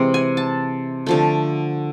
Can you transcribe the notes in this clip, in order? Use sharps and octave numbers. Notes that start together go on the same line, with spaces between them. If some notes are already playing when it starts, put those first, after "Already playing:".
Already playing: C3 E3 G#3 C4
G#5
A5
D3 F3 A3